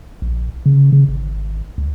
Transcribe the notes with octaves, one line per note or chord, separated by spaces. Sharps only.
A#1
C#3
C#3
G#1
C#2